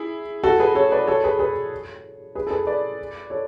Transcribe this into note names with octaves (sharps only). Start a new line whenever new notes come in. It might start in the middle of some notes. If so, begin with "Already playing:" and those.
Already playing: E4 G#4
F#4 A4
G#4 B4
A4 C#5
B4 D5
A4 C#5
G#4 B4
G#4 B4
G#4 B4
A4
G#4 B4
B4 D5
A4 C#5